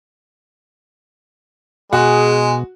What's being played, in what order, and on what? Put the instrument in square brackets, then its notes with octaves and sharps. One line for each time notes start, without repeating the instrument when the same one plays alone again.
[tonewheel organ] B2 [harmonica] G#3 [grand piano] F#4 [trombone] G#4